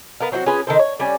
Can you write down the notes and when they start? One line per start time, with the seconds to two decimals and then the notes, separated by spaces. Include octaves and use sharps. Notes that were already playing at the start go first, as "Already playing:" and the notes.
0.20 B3 A#4 F5
0.32 F#3 C4 E4 F#4
0.46 C#4 F4 G#4 B4
0.67 D#3 A4 C5
0.79 C#5
0.99 G3 C#4